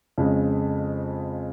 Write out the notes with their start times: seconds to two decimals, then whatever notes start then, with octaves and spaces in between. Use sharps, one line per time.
0.18 F2 C#3 G#3